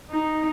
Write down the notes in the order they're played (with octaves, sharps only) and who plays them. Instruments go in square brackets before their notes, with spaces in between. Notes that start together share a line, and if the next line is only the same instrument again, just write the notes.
[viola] D#4